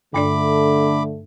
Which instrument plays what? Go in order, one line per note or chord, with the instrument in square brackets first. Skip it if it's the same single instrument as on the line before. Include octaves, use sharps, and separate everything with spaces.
[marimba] G2 D4 D5 [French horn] D3 [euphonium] A3 [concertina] B5 D6